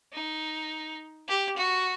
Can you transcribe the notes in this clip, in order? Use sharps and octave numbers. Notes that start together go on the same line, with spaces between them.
D#4
G4
F#4